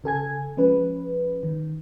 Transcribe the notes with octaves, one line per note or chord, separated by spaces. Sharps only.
C#3 A4 G#5 G#6
F3 G#3 C#4 B4
D#3